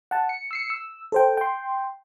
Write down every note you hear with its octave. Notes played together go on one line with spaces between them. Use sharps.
F#5 A5
C#7
E6 C7 C#7
E6
A4 C5 G5
G5 C6